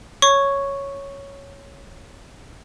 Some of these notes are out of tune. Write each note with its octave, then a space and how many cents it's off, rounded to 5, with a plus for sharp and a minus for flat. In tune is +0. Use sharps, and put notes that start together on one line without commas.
C#5 +0 C#6 +0